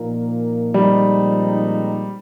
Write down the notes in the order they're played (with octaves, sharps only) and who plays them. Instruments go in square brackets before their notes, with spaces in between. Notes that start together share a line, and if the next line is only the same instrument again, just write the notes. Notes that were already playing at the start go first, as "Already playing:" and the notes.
Already playing: [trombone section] A#2 F3 A#3 D#4 A#4
[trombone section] A#2 F3 G#3 C4 D#4 [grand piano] G3